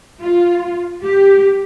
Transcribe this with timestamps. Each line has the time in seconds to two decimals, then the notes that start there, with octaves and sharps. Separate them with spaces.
0.21 F4
1.03 G4